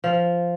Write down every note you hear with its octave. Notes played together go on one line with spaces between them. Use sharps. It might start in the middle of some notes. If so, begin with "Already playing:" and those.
F3